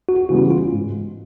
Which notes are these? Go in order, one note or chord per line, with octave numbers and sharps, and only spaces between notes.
F#4
C#3 E3 G3 B3 F#4
F4
G#2